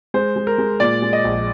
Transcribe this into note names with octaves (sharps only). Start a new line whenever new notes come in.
G#3 C5
G#3
A#4
G#3
A#2 D5
G#3
D#5
A#1